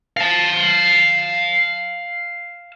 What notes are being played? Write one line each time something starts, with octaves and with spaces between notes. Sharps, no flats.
F5 A5